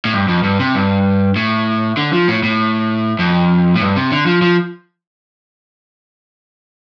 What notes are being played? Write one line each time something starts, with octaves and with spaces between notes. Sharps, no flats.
A2
G2
F2
G2
C3
G2
A2
D3
F3
A2
A2
F2
A2
G2
C3
D3
F3
F3